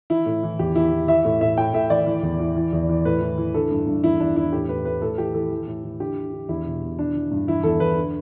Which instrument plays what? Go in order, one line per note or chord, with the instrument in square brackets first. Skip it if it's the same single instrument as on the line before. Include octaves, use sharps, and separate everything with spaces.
[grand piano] E3 E4
A2
E3
E2 G4
E3 E4
E3
E3 E5
A2
A2 E5
A2 G5
A2 E5
E3 D5
E3
E2
E3
E3
E2
E3
A2 B4
E3
E3
D3 A4
G2
G2
E2 E4
E2 D4
E2 E4
A2 G4
A2 B4
A2 B4
A2 A4
E3 G4
E3 A4
E3
A2
E3
D3 G4
D3
D3
E2 E4
B2
B2
E3 D4
E3
G2
E3 E4
E2 A4
E2 B4
D3